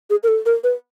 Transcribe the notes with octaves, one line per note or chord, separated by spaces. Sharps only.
G#4
A#4
A4
A#4
B4